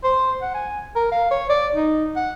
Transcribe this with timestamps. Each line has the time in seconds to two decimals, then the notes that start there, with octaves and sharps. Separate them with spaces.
0.04 C5
0.42 F#5
0.54 G#5
0.96 A#4
1.12 F5
1.31 C#5
1.50 D5
1.75 D#4
2.16 F#5